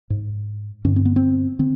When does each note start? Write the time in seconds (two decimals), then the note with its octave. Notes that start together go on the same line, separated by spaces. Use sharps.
0.10 G#2
0.85 G2 D3 C#4
0.96 C4
1.05 B3
1.16 C4
1.59 D3 C4